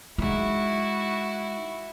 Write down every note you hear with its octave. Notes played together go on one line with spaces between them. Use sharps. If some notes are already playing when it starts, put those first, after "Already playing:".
G#3 D#4 E4 F#4